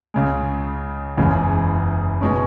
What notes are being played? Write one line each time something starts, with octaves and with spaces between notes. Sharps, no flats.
C#2 C#3 G#3
F#1 E2 C#3 G#3
B2 G#3 C#4